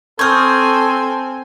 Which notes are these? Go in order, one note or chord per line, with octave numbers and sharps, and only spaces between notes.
C4 A4 G#5 C#6 D#6 F6 G6 G#6